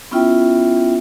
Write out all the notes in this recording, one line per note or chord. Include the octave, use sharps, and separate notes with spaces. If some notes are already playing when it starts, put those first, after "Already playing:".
B3 C#4 E4 F4 E5 G5